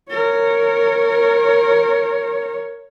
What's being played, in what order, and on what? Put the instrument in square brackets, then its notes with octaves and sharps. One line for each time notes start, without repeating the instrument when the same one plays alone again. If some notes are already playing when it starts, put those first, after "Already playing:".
[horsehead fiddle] A#4 C#5